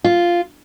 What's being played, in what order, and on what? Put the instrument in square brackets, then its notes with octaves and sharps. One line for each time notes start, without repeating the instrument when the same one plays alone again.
[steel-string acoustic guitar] F4